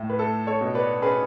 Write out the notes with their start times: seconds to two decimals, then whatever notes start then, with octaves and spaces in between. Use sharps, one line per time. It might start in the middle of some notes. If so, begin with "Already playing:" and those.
Already playing: A2
0.10 B4
0.19 A3 A4
0.47 A4 C#5
0.61 B2
0.74 B4 D5
1.02 C#4 G#4 B4